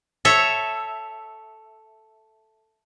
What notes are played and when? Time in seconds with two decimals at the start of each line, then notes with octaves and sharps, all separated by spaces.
0.25 A4 C#5 E5